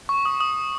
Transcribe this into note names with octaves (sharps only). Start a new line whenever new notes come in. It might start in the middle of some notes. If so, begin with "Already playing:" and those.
C#6
D#6
D#6